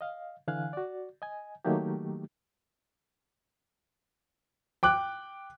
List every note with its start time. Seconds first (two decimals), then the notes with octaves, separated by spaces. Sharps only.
0.01 D#5 F5
0.48 D3 E3 F5 G#5 F#6
0.73 F#4 D5
1.22 D#5 G#5
1.65 D#3 F#3 A3 A#3 D#4 G4
4.83 G5 D6 F#6